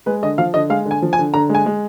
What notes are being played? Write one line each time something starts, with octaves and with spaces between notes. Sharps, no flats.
G#3 B4
D3 D#5
F3 F5
D3 D#5
G#3 F5
D3
G#5
F3
G#5
D3
D3 A#5
G#3
G#5
G#3